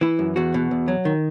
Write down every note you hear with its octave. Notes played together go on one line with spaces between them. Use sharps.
E3 E4
F#2
E2 F#4
B2
E2
F#3
D#3